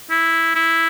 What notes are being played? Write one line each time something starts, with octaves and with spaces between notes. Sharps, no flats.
E4
E4